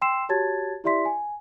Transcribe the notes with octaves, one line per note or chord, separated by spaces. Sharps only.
G5 C6 E6 C7 E7
F#4 G4 C#5 A5 G#6 A6
E4 G4 D5 E5 C6 B6
G#5